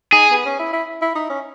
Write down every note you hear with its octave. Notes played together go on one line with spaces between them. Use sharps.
D#4 G#4
B3
C#4
E4
E4
E4
D#4
C#4